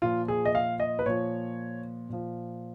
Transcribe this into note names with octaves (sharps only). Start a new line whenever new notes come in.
A#2 F3 F4
G#4
D#5
F5
D#5
B4
A#2 F3 C#5
A#2 F3